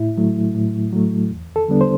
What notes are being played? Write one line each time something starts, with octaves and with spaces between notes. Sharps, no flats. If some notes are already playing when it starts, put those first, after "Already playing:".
Already playing: A2 E4
F#3 A3
A2
F#3 A3
E2
A4
D3 G3 B3 D4
C5